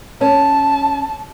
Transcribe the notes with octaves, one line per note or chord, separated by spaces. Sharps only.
C#4 A5